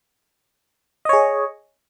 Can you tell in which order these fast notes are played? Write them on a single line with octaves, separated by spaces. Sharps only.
D#5 C#5 G#4